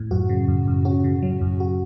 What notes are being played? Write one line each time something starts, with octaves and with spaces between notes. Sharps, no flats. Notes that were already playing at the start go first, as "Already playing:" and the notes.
Already playing: A2
F#2 F#4
C#3
F#2
F#2
C#4 F#4
C#3
F#3
F#2
F#4